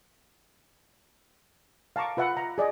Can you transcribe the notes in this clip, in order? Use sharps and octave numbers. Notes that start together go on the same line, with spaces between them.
F5 A5 A#5 C#6 D6
F4 B4 E5 F#5 B5
A#5
G#4 D5 D#5